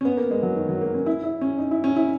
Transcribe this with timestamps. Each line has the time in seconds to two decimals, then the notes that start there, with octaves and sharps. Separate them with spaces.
0.01 C#4
0.05 B3
0.17 A#3
0.31 G#3
0.43 F#3
0.56 D#3
0.69 F#3
0.81 A#3
0.94 C#4
1.06 E4
1.23 E4
1.41 C#4
1.59 D#4
1.71 E4
1.84 C#4
1.96 E4